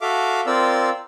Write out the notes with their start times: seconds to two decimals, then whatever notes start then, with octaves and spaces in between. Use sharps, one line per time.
0.01 F#4 A4 E5 F5 D6
0.47 C4 F4 A#4 D5 E6